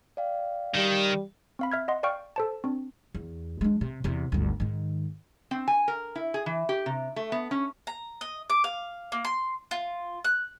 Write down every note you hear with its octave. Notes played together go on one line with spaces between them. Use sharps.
D5 F5 G5
D#3 G3
C4 F5 B5
E5 F6 G#6
D#5 F#5 C6
D5 F5 G5 C#6 F6
A4 C5 A5
C4 D4
E2
G#3 D4
C3
E2 C3
G1 D2
G#2 D#3
C4
G#5
A#4
E4
G#4
E3
G4
C3
A3
B3
C#4
A#5
D#5
D6
F5
A#3
C6
F4
F#6